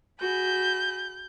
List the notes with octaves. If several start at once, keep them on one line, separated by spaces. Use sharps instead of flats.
F#4 G#4 B5 G6